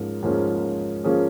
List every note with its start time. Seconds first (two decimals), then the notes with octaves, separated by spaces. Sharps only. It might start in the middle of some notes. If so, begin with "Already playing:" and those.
Already playing: G#2 F3 A#3 C#4
0.22 G#2 F3 A#3 C#4 G#4
1.04 F3 A#3 C#4 G#4